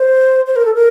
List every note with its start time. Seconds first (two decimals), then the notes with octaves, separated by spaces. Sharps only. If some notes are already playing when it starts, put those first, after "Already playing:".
Already playing: C5
0.47 C5
0.56 A#4
0.65 A4
0.74 A#4